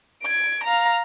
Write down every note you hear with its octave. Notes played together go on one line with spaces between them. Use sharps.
G#6 D7
F5 A#5